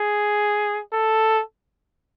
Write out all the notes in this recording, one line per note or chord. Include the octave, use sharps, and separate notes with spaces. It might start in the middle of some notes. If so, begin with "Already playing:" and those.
Already playing: G#4
A4